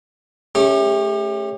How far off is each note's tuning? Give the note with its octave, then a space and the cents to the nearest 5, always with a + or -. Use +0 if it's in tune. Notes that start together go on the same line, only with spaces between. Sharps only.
A3 -15 C#4 +0 G4 +35